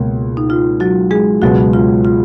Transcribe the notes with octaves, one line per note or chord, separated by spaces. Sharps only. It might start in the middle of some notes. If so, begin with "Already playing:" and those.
Already playing: C#2 B2 A#3
D#4
F4
F#3 F#4
G#3 G#4
C#2 B2 F#3 G#3 B3 F#4
F4
F4